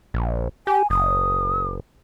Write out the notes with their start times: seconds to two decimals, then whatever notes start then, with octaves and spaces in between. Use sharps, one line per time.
0.14 A#1
0.67 G4 G#5
0.90 F#1 D#6